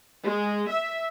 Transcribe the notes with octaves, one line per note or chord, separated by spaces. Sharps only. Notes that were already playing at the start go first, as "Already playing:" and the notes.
G#3
E5